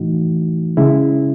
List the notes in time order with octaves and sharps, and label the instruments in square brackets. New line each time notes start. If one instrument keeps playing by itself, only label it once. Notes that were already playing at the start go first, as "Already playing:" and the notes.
Already playing: [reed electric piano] A2 E3 A3 D#4 F#4
C#3 G#3 C#4 E4